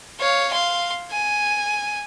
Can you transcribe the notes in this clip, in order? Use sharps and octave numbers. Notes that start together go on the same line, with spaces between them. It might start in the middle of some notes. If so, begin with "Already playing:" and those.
C#5 F5
F5 C6
G#5